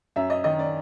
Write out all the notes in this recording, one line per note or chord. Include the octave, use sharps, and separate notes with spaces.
F#2 E5
D#5
D#3 D#5
D5